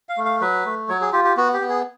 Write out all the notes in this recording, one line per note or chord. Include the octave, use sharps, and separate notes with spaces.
F5
A3
F5
F#3 B4
A3
F#3 C#5
G#4
F4 G4
G4
B3 F#4
G4
B3
G#4